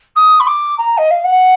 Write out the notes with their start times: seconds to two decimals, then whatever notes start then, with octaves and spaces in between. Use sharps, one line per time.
0.16 D#6
0.40 B5
0.47 D6
0.78 A#5
0.97 D#5
1.10 F5
1.24 F#5